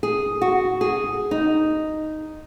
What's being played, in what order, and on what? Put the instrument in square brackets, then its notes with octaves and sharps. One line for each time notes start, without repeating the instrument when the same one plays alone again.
[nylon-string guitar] G#4
F#4
G#4
D#4